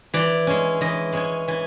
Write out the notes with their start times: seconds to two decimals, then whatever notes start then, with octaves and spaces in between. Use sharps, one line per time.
0.14 E3 D5
0.47 G#3 C#4
0.81 E3 D#5
1.12 G#3 C#4 G#5
1.48 E3 G#5